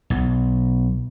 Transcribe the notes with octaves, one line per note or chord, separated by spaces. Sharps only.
B1